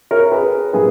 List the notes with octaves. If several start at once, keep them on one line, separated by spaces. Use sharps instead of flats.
A#4 C#5
G#4 B4
A#2 G3 G#4 B4